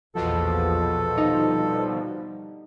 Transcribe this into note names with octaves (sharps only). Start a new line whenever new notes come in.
A#1 E2 B2 F3 A4
D3 G3 D#4